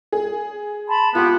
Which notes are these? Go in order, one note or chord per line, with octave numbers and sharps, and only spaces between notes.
G#4
A5 B5 C6
B3 F4 G4 C6